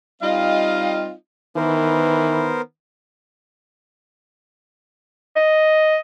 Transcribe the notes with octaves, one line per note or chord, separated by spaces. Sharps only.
G3 C4 D#4 F4 D#5 F5
D#3 E3 B3 A#4 C5
D#5